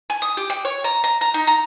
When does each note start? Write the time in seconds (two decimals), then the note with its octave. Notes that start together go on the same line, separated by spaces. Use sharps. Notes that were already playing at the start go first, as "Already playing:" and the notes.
0.10 G#5
0.22 D#6
0.37 G4
0.50 G5
0.65 C#5
0.84 A#5
1.04 A#5
1.21 A#5
1.34 D#4
1.47 A#5